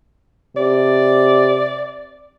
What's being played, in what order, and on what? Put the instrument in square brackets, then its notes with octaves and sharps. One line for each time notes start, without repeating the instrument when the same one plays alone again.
[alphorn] C3 [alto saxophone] D5